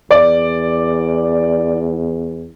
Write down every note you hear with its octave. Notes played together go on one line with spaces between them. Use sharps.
E2 D5